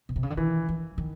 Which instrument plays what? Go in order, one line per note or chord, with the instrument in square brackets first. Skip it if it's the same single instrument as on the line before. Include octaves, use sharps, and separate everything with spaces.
[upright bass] B2
C3
C#3
D3
[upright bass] D#3 [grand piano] E3
[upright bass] E3
D#3